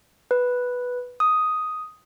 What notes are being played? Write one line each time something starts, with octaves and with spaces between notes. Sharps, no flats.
B4
D#6